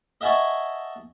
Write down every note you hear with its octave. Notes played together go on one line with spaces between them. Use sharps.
D#5 E5 F#5 G#5 A5 C#6